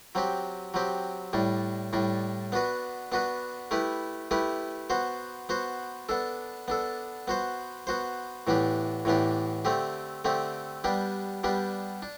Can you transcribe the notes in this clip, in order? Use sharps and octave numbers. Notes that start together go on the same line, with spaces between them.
F#3 C4 G4
F#3 C4 G4
A2 G3 D4
A2 G3 D4
B3 D4 F#4 B4
B3 D4 F#4 B4
A3 E4 G4 B4
A3 E4 G4 B4
B3 F#4 C5
B3 F#4 C5
B3 D4 A4
B3 D4 A4
B3 F#4 C5
B3 F#4 C5
A2 E3 B3 D4 G4
A2 E3 B3 D4 G4
D3 A3 C4 G4
D3 A3 C4 G4
G3 B3 D4 G4
G3 B3 D4 G4
D4